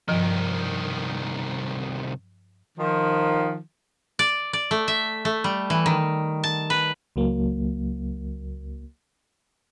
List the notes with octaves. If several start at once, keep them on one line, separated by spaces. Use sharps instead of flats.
C2 G2 D#3 F3
D#3 F3
D5
D5
A3
E5
A3
G3
E3
D#3
A5
B4
C#2 F#3 A#3